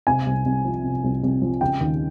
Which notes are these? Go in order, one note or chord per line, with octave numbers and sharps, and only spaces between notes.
C3 G#5
C2
C2
F3
C3
C2
C2
F3
C#3 G5
D#2